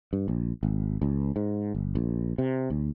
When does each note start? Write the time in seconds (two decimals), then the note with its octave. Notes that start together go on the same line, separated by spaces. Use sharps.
0.13 G2
0.28 A#1
0.63 G#1
1.02 C#2
1.36 G#2
1.74 G1
1.95 A#1
2.38 C3
2.70 D2